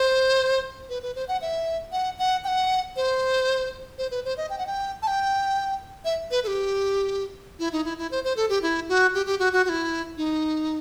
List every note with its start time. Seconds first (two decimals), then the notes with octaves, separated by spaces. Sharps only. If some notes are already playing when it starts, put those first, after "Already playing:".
Already playing: C5
0.89 B4
1.03 B4
1.15 C5
1.28 F#5
1.42 E5
1.92 F#5
2.19 F#5
2.44 G5
2.48 F#5
2.96 C5
3.98 C5
4.11 B4
4.25 C5
4.37 D#5
4.50 G5
4.58 F#5
4.67 G5
5.02 A5
5.07 G5
6.05 E5
6.31 B4
6.44 A4
6.47 G4
7.59 E4
7.72 D#4
7.85 E4
7.98 E4
8.11 C5
8.24 C5
8.36 A4
8.49 G4
8.62 E4
8.89 F#4
9.14 G4
9.26 G4
9.39 F#4
9.53 F#4
9.65 F#4
9.69 E4
10.17 D#4